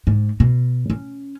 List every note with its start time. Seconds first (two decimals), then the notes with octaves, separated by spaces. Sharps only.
0.07 G#2
0.40 B2
0.90 C#4